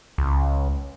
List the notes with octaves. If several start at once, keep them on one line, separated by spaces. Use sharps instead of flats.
C#2